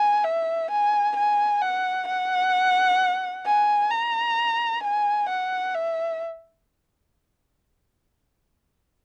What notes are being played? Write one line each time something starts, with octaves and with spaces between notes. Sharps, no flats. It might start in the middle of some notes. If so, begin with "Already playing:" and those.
Already playing: G#5
E5
G#5
G#5
F#5
F#5
G#5
A#5
G#5
F#5
E5